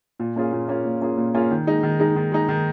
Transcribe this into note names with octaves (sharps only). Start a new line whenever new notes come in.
A#2
A#3 C#4 F4 G#4
A#2
A#3 C#4 F4 G#4
A#2
A#3 C#4 F4 G#4
A#2
A#3 C#4 F4 G#4
D#3
G#3 D#4
D#3
G#3 D#4
D#3
G#3 D#4
D#3